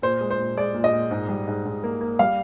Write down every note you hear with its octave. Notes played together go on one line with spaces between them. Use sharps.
A#2 C5
G#3
C5
A#2
G#3 D5
A#2
D#5
A#2
G#2
G3
G#2
G#2
A#3
A#3
G3 F5